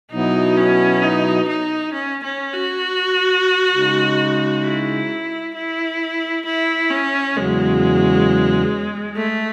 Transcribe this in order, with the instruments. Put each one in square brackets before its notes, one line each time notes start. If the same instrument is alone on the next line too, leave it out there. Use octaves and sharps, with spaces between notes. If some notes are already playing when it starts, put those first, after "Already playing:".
[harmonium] B2 F#3 B3 E4 [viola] D#4
[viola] C#4
D#4
D#4
C#4
C#4
F#4
[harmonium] C#3 G#3 D#4
[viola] E4
E4
E4
C#4
[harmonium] E2 C#3 F#3 [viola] G#3
[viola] A3